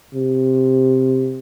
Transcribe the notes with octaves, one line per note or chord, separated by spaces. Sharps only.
C3